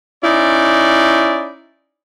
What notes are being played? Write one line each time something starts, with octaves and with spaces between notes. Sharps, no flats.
C#4 D#4 E4 D5